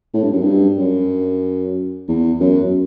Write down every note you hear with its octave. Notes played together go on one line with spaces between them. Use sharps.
A2
G2
F#2
G2
F#2
E2
F#2